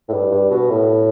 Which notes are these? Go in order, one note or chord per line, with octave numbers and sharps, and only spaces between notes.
A2
G2
G2
B2
A2